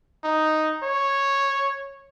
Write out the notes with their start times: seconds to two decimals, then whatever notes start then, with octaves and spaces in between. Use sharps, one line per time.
0.24 D#4
0.84 C#5